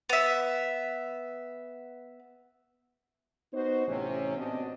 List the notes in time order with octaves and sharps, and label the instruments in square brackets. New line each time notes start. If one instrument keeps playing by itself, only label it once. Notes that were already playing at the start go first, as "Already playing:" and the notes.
[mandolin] B3 E5
[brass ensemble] B3 D#4 F#4 C5
A1 C3 C#4
B3 C4 D4 F#4 D#5